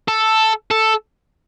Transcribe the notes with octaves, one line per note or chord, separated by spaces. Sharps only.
A4
A4